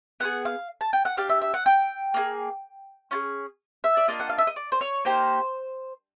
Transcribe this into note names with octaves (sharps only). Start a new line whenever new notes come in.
B3 E4 G#4 F#5
F5
A5
G5
F#5
D4 G4 F5
E5
E5
F#5
G5
A#3 D#4 G#4
C#4 F4 G#4
E5
D5
A#3 D4 F4 D#5
F#5
F5
E5
D#5
D5
C5
C#5
A#3 D#4 G4 C5